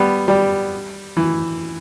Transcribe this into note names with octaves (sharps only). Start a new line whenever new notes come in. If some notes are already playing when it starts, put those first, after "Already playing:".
Already playing: G3 B3
G3
E3